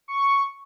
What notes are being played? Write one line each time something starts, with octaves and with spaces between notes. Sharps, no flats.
C#6